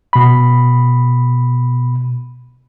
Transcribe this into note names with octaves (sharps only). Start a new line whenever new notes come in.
B2 B5